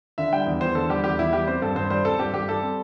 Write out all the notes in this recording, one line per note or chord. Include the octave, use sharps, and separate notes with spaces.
D3 E5
G3 G5
E2
E2 C5
D3 A4
G3 G4
E2 G4
E2 E4
G3 G4
C4 C5
G2 A4
G2 C5
G3 C5
C4 A4
G2 G4
G2 G4
G3 A4
C4